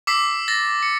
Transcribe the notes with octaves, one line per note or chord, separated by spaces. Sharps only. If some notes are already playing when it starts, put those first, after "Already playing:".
D6 E6 B6 C7
A6 A#6
C#7